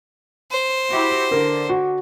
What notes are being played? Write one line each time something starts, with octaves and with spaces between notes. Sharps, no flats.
C5
E4 F#4 G4
D3 A#4
F#4